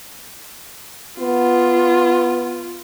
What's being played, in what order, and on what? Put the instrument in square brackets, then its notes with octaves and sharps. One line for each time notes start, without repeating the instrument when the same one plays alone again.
[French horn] B3 [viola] F4